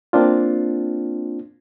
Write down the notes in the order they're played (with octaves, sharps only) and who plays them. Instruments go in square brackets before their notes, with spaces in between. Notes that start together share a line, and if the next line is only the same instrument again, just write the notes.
[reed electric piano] A#3 C4 D4 F4